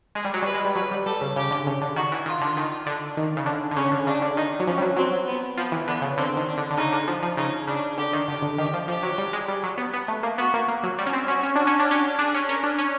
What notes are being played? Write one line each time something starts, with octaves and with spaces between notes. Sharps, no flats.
G#3 G#4
G3
F#3
G3 B4
G#3
G3
F#3 B4
G3
G3 A4
C#3
C#3 G4
D3
C#3
D3
D#3 F#4
E3
D#3 F4
D3
D#3
D3
D#3
C#3
D3
D3
C#3 C#4
D3
C#3 D4
D3
D#3 D#4
F#3
F3 C#4
G3
F#3
F#3 C4
B3
F3 B3
E3
D3 B3
C#3
D3 C4
D#3
D4
D3
D3
C#3 D#4
D3
F3
F3
C#3 D#4
C#3 D4
D3 G4
D#3
D3 G4
D3
D#3 G4
F3
F3 G4
F#3
G3
G#3
G3
F#3
B3
B3
A3
A#3
B3 F#4
A#3
A#3
F#3
G3 F#4
C#4
C4
C#4 F#4
C#4
D4 F#4
C#4
D4
C#4 G4
D4 G#4
C#4
C#4 A#4
D4
C#4